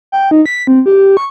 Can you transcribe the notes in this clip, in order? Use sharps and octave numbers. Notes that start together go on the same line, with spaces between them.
G5
D#4
B6
C4
G4
C#6